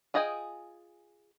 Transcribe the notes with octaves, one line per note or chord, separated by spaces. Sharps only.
F4 G#4 D#5 G5 G#5